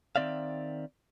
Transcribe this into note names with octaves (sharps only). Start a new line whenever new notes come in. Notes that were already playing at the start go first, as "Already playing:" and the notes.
D#3 F#3 C4 D5 E5 F5